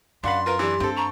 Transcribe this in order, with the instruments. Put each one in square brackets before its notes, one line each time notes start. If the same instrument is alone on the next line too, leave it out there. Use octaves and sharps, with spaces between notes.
[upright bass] F#2 [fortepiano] D4 F#5 B5 [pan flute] F5 [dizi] C6
[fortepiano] F4 A#4 [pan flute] B4
[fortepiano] E3 D4 [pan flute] G4
[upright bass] G2 [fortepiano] C4 A4
[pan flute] A#5 [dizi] C#6